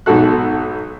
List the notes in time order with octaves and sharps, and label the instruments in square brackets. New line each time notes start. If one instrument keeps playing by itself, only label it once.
[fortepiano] B1 G#2 F#4 A4 F#6